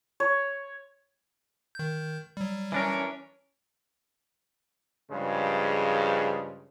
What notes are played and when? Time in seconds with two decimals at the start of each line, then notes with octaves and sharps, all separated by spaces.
0.20 C#5
1.75 D#3 G6
2.37 F#3 G3
2.72 E3 C#4 D4 A#4
5.11 G2 C#3 F3 G#3